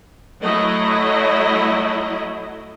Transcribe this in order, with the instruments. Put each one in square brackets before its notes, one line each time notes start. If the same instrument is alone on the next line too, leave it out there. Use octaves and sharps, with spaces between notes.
[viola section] F#3 A3 E4 D#5